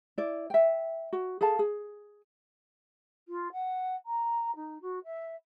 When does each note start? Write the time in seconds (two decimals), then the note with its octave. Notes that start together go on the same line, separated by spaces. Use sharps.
0.18 E4 D5
0.50 E5 G5
1.13 F#4
1.41 G#4 A4 F5 A5
1.59 G#4
3.28 F4
3.52 F#5
4.06 A#5
4.55 D#4
4.81 F#4
5.04 E5